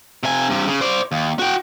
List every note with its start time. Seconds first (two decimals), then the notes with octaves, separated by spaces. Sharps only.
0.23 C3 G#5
0.50 G2 C3
0.67 C#3
0.81 C5 D5
1.12 D#2
1.39 F#4 G5